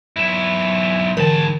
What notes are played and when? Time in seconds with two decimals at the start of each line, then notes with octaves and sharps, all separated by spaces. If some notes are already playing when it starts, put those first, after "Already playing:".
0.16 B1 E4
1.17 G#2 D3 E3 A#4 A5